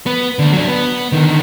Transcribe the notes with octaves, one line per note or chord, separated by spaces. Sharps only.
B3
D2 D3
F#3 D4
B3
D3 D#3